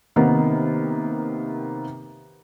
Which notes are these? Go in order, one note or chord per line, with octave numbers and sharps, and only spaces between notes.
C3 D#3 A#3 B3